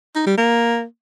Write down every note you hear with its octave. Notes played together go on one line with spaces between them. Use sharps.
D#4
G3
A#3